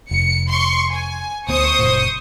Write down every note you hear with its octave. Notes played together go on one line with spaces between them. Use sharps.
F1 C#7
C6 C#6
G#5
D2 B3 C5 C#6 D#6
F#1 A#2